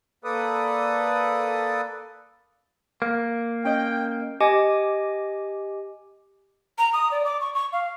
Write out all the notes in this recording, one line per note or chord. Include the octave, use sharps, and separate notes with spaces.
A#3 A4 B4 D5 D#6
A#3
C#4 D#5 G5
G4 D#5 G#5 D6
A#5
D#6
D5
D6
C#6
C#6
F5